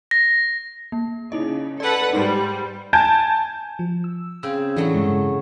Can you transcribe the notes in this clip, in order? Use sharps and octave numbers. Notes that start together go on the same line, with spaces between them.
A#6
A#3
C#3 D#4 E4 D#5
A4 B4 D5 F#5 C#7
G#2 G3 D#4 C6 C7
G#5 A5 G6 G#6 D7
F3
E6
C#3 C4 E6
A2 E3 F#3 A3 D4
G2 C#3 G#3